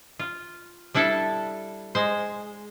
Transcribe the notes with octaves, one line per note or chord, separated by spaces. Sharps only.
F4
G3 D4 E4 A4
G#3 C5